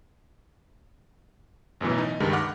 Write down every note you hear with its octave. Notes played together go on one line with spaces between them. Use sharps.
A1 F#2 B2 E3
D#4
C#2 G2 D#3 G3 G#3
F#5 D6 F6